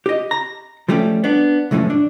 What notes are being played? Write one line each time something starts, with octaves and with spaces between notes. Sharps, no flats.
G4 D#5
A#5
F3 G3 A3 C#4 G4
B3 D4
C#2 F#2 A2 E3 F3 C#4
D4